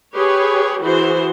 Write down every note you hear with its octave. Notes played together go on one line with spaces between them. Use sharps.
G4 G#4 B4 C#5
E3 F#4 G#4 C5